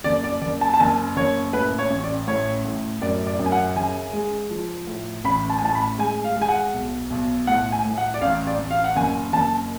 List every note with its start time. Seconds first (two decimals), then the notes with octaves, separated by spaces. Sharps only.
0.04 F#1 D5
0.24 D5
0.42 F#1 D5
0.61 A5
0.74 A5
0.80 F#1 G#5
1.16 F#1 C#5
1.53 A2 B4
1.78 C#5
1.90 A1
2.04 D5
2.27 A2 C#5
2.65 A2
3.02 F#2 D5
3.27 D5
3.39 F#2
3.46 G#5
3.52 F#5
3.76 C#3 G#5
4.13 G#3
4.50 F3
4.87 A2
5.24 A1 B5
5.50 A5
5.58 G#5
5.61 A2 A5
5.75 B5
5.98 G#3 G#5
6.24 F5
6.36 G#3
6.42 G#5
6.49 F#5
6.74 B1
7.10 B1
7.47 A2 F#5
7.72 G#5
7.85 A2
7.98 F#5
8.14 D5
8.22 A1 F5
8.47 D5
8.58 A1
8.71 F5
8.84 F#5
8.96 F#1 G#5
9.33 F#1 A5